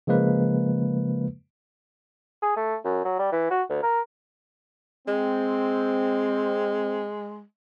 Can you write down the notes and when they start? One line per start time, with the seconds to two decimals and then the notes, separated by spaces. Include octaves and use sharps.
0.07 C#3 F3 G#3 A#3 B4
2.42 G#4
2.56 A3
2.84 F#2
3.05 F#3
3.19 G3
3.32 E3
3.50 F#4
3.70 D2
3.83 A#4
5.08 G#3 C4